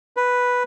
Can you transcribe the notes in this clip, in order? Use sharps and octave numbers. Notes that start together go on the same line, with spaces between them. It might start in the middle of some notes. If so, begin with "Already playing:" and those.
B4